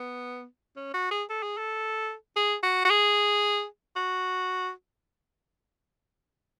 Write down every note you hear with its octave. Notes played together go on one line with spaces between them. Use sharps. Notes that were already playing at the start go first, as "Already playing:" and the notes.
Already playing: B3
C#4
F#4
G#4
A4
G#4
A4
G#4
F#4
F#4
G#4
F#4